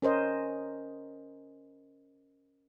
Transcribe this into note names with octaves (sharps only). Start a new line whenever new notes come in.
C#4 A#4 C5 D#5